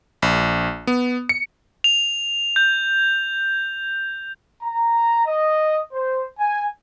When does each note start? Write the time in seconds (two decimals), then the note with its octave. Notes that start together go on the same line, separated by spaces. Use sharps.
0.22 A#1
0.87 B3
1.29 C#7
1.84 F7
2.56 G6
4.63 A#5
5.26 D#5
5.93 C5
6.39 G#5